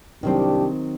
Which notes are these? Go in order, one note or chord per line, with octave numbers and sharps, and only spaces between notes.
C2 D#3 F#3 C4 D4 G4